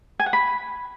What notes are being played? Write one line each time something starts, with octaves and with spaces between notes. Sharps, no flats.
G#5
F#5
B5